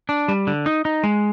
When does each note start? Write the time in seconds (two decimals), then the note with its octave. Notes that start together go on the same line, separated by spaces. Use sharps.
0.09 D4
0.28 G3
0.47 D3
0.66 D#4
0.85 D#4
1.04 G#3